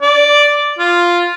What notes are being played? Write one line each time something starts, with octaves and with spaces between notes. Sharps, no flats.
D5
F4